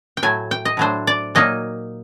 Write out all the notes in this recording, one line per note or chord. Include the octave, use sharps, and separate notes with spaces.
G5
A2 F#3 A3 G#5
G5
D#5
A2 F#3 A3 D4 C5
D5
A#2 F#3 A#3 D#4 D#5